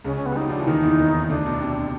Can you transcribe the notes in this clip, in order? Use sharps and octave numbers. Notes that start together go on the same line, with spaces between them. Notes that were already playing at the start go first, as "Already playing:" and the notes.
C#2 C#3 C#4
C#4
B3
G3
F#3 D#4
F3 D4
E3
D#2 D#3 D#4
E2 E3
D#2 D#3
D2 D3 D4
B2
C3